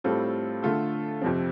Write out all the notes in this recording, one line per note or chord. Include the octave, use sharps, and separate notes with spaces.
A2 G3 C4 F4 A4
D3 A3 F4 A4
F2 C3 F3 C4